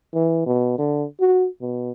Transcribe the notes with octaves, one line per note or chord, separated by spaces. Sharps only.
E3
B2
D3
F#4
B2